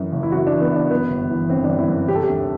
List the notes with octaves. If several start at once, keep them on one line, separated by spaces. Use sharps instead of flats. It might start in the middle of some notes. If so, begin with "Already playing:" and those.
Already playing: F#2 E3
F#1
E4
F#2 F#4
E3 D4
B3
E3 D4
F#2 B3
G1
E3
G1 C4
G1 D4
E4
F#2
C3 G4
A4
G4
D2